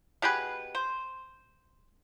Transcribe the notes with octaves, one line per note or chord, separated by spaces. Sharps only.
B2 G4 G#4 B4
C5